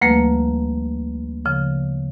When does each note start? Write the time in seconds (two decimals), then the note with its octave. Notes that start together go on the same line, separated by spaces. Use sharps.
0.01 D2 F3 G3 A3 A#3 B4
1.45 C#3 F3